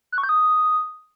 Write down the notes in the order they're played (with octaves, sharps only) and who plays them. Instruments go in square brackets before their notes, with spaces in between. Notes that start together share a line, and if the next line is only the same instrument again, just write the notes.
[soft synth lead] F#6
C#6
G6
D#6